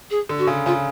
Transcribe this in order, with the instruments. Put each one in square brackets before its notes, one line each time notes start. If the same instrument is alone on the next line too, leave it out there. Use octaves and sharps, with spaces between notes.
[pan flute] G#4
[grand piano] D3
[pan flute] F#4
[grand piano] C#3
[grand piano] C#3 [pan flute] F4